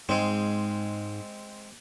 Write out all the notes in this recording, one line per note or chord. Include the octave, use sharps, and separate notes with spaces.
G#2 G#3 C4